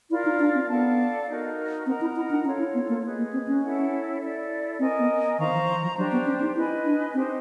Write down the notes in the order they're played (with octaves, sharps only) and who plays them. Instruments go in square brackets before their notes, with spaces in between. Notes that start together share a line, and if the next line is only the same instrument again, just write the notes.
[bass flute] E4 [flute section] F4 A#4 D5 F5
[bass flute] D#4
D4
C4
[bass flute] B3 [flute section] A4 D5 F5 A5
[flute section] D#4 F#4 A#4
[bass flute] C4 [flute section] A#4 D#5 F#5 A#5
[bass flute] E4
E4
D4
[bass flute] C#4 [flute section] F4 A4 C#5 F5
[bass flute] E4
B3
A#3
[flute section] G#4 B4 D#5
[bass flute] A#3
C4
C#4
[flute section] E4 A4 C#5 F#5
E4 A4 D5
[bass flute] C4 [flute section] A#4 D#5 G#5
[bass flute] B3
[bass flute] D#3 [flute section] C5 F5 A#5 C#6
[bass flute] E3
E3
F3
[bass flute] F#3 [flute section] D4 G4 C5
[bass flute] B3
C#4
D#4
[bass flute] E4 [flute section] B4 D#5 G#5
[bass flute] D4
[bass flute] C4 [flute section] D#4 G4 C5